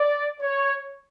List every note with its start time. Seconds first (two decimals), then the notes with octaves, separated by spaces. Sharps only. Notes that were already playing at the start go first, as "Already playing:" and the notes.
Already playing: D5
0.41 C#5